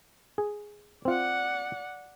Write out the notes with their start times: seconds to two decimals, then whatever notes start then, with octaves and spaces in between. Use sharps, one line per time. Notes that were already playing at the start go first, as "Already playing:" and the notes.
0.38 G#4
1.05 C4 F4 D5 F#5